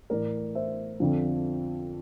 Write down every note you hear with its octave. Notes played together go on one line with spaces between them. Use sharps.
A2 E3 A#4 D5
C5 E5
F2 D3 F3